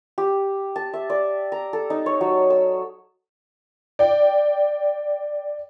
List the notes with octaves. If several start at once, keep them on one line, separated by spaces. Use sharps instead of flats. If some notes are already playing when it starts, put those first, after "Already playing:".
G4
A5
E5
D5
A#5
A4
D#4
C#5
F#3
E6
D5 G5